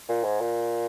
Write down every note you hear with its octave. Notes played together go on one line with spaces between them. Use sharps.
A#2
G#2
A#2